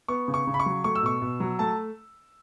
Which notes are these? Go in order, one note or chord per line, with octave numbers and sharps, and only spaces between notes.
B3 C#6
C#3
C#6
C#3
B5
C#6
F#3
A3 C#6
E6
B2 C#6
B2
F#3
A3 A5